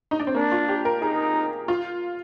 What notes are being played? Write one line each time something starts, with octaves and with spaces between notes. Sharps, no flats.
D#4
D4
C4
A#3 D4
F4
G4
A#4
D#4 G#4
F4